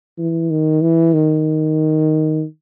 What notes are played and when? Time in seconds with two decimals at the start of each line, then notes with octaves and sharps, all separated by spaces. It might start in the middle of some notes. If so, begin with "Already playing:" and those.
0.18 E3
0.50 D#3
0.82 E3
1.13 D#3